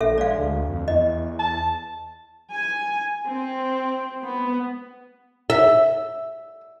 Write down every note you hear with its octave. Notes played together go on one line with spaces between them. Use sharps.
A#1 A4 E5
G#3 D5 F5
D2
F2
E2 D#5
A5
G#5
C4
B3
E5